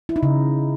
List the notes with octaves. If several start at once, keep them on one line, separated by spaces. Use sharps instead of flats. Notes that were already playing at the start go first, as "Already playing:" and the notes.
E4
D#4
C#3